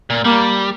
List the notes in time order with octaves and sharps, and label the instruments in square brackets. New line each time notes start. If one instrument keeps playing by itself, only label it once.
[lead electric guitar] A#2
[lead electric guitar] G3 [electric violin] A#3